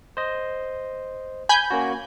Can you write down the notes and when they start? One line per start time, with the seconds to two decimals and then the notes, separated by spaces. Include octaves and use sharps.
0.17 C5 D#5
1.49 G#5 B5 G6
1.70 A#3 C#4 F#4